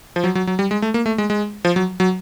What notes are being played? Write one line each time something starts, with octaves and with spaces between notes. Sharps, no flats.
F3
F#3
F#3
F#3
G3
G#3
A3
A#3
A3
G#3
G#3
F3
F#3
F#3